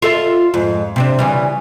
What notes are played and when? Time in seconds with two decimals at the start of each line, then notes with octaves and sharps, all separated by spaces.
0.02 F4 A4 E5
0.54 F2 G#2
0.96 C3 C4 D4
1.19 C#3 E3 G3